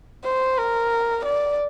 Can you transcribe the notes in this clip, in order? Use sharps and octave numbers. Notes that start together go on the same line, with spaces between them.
C5
A#4
D5